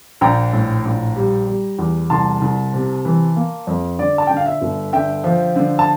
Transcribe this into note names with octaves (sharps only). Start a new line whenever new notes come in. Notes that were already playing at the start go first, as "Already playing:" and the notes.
A#1 G5 A#5
A2
A#1
G3
G3
E2
C2 A5 C6
C2
C3
E3
A#3
F2
D3 D5
A5
D3 G5
F5
E5
G1
D3 E5 G5
F3
D3
A5